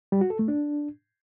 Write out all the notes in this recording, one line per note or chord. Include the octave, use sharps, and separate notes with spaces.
G3
F#4
A4
A3
D4